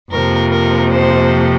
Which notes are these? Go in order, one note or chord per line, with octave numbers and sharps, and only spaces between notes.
F2 C3 F3 A#3 A#4
A#4
C5